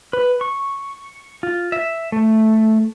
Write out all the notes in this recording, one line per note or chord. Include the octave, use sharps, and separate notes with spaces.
B4
C#6
F4
E5
A3